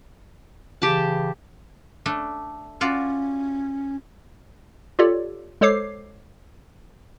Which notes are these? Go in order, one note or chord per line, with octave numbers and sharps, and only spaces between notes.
C#3 E3 G4 A5
A3 D4
C#4 F4 F#4 D5
F4 G4 A4 C#5 D5
G#3 A4 C5 C#5 D6 C7